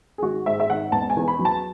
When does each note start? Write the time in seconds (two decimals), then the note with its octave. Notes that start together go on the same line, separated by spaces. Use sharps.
0.18 G#4
0.22 G#1 F#4
0.46 G#2 E5
0.60 E5
0.70 G#1 F#5
0.92 E1 A5
1.10 G#5
1.17 E2
1.28 B5
1.39 F#3
1.45 A5